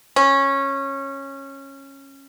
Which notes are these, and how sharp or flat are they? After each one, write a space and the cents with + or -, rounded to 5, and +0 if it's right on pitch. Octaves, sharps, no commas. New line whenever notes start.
C#4 -15